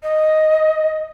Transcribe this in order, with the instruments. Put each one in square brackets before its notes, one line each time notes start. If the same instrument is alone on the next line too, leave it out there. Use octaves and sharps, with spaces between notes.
[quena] D#5